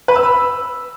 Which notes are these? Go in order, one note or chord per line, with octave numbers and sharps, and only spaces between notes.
B4
E6
B5